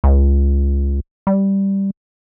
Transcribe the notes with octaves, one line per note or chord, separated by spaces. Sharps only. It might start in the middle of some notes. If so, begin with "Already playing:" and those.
C#2
G3